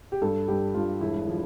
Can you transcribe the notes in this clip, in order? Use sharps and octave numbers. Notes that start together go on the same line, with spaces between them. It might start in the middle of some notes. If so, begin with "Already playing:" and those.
G4
G2 A4
G2 G4
G2 F4
E1 E4
F3